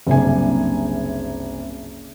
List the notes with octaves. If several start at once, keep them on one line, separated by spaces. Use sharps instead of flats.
F#1 C2 D4 G#5